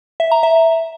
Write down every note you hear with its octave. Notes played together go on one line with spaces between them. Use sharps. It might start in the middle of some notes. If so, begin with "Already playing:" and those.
E5
A#5
E5